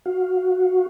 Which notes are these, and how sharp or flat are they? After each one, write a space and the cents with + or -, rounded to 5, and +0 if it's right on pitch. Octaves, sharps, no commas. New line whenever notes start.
F#4 -10 F5 +15